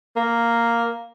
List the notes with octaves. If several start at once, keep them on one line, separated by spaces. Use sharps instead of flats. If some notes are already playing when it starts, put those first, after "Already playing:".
A#3